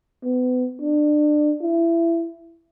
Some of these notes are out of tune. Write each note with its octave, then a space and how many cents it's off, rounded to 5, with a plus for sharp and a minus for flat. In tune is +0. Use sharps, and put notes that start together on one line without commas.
B3 +30
D4 +25
E4 +25